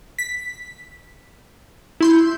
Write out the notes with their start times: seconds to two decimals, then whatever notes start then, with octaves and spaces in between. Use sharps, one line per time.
0.19 B6
2.01 E4 C6 G6